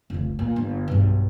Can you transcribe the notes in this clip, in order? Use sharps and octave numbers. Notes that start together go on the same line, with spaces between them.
F1 C#2
A#2
G1
B1 G2